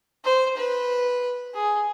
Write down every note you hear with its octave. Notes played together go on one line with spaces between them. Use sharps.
C5
B4
G#4